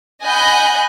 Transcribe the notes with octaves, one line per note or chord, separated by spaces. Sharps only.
D#5 F#5 G#5 B5 F#6 G6